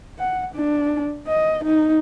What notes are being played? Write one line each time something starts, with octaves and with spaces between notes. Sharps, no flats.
F#5
D4
D#5
D#4